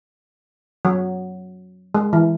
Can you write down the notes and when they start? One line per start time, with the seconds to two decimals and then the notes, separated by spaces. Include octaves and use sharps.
0.85 F#3
1.95 G#3
2.13 E3